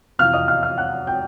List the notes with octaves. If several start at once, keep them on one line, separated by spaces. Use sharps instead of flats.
F2 C3 E3 F5 F6
D#5 D#6
F5 F6
F5 F6
F#5 F#6
G5 G6